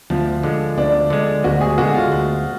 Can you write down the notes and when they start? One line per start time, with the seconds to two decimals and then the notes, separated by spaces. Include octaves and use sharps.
0.10 D2 F3
0.43 D3 G#3
0.78 D2 D4
1.10 D3 G#3
1.44 D2 F#4
1.61 G#4
1.78 D3 G#3 F#4
1.94 F4
2.12 D2